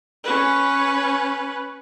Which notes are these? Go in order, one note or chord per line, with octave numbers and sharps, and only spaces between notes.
C#4 B4